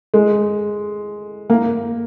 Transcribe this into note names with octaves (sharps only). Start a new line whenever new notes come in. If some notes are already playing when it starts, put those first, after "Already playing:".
G#3
A#3